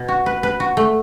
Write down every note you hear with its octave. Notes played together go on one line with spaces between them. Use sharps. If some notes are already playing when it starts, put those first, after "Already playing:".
Already playing: B2
F#4
B4
B4
F#4
A3